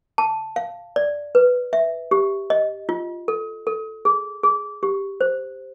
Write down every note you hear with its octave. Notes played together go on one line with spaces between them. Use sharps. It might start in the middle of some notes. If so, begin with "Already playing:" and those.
A5
F5
D5
B4
E5
G4
D#5
F4
A4
A4
G#4
G#4
G4
C5